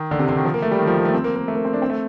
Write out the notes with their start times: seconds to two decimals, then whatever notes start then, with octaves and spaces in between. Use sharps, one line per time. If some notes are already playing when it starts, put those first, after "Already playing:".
Already playing: D#3
0.11 D3
0.19 C3
0.29 D3
0.37 D#3
0.45 F3
0.54 A#3
0.62 A3
0.71 G3
0.79 D#3
0.87 F3
0.97 G3
1.05 A3
1.14 C4
1.24 A#3
1.36 A#3
1.48 A3
1.56 A#3
1.65 C4
1.73 D4
1.82 C4
1.90 A3